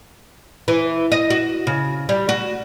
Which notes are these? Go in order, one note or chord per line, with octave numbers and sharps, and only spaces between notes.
E3
D#5
F#4
C#3
G3
F#4